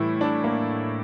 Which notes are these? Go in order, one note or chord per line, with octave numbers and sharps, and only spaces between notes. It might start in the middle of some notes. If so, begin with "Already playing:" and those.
Already playing: A2 E3 G3 E4
D4
A#3